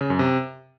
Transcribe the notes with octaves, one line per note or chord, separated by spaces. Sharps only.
C#3
F#2
C3